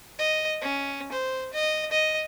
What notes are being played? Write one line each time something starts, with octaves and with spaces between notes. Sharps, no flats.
D#5
C#4
C5
D#5
D#5